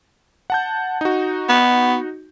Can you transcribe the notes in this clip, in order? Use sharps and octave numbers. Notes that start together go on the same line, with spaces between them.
F#5 A5 G6
D#4 F#4
B3